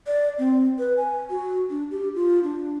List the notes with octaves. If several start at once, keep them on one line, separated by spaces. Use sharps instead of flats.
D5
C4
B4
G#5
F#4
D4
G4
F4
D4